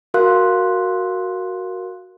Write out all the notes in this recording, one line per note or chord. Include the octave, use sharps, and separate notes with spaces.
F#4 A#4 F5 C6 F#6